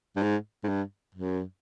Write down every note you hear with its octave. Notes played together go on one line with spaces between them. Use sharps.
G2
G#2
G#2
G2
F#2